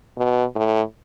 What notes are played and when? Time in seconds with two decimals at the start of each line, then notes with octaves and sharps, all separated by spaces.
0.18 B2
0.56 A2